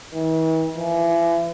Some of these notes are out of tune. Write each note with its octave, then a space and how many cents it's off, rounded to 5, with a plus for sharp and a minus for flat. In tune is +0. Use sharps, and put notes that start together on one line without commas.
E3 -40
E3 +35